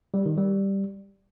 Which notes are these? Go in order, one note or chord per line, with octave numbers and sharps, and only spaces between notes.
G3
D#3
G3